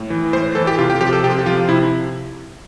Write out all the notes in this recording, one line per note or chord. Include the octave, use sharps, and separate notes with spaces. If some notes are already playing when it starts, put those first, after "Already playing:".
Already playing: A2
E3
A2 C5
E3 A4
G4
C3 F4
G4
F3 G4
A4
C3 G4
G4
F3 F4
C3 E4